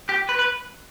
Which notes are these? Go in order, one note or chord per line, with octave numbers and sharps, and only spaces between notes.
G4
B4
B4